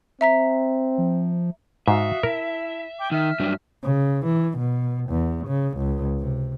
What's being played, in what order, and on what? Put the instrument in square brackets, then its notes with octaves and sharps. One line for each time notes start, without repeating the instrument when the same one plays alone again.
[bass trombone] C4 [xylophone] E5 A#5 B6
[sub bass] F3
[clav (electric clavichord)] G#2 [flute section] F#4 F5 D#6 [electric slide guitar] E5
[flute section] E4 A5 [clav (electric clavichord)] A#4
[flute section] G5 D6
[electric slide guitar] D#3 [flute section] E5 F6
[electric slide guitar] G2 F#3 D4
[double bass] C#3
E3
B2
E2
C#3
C#2
C3